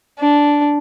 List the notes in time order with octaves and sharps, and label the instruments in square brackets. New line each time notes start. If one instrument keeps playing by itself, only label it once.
[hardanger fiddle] D4